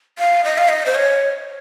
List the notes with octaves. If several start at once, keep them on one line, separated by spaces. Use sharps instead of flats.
F5
D#5
F5
D#5
C5
C#5